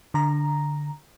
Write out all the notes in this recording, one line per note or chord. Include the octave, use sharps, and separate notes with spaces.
D3 A#5